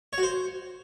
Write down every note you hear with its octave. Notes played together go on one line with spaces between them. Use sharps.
C#5
F#4
C5